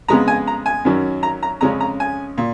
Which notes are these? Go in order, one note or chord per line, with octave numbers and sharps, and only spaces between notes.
F2 C#3 G#3 B3 A#5
G#5
A#5
G#5
F#2 D#3 F#3 C#4
A#5
A#5
F2 C#3 G#3 C#4 A#5
A#5
G#5
A#2